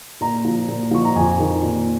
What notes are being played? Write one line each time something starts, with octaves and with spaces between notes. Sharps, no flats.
A#2 A#5
F3
A#2
F3 C#6
A#5
F2 G#5
D#3
A#2